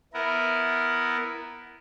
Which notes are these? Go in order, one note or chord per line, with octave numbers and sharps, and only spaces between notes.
B3 E4 A#4